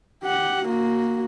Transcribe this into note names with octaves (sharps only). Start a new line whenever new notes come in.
G4 F#5
A#3 F#4